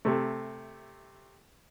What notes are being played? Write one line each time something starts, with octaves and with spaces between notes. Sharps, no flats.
C3 A3